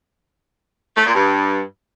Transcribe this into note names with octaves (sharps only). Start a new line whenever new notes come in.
A3
A#2
G2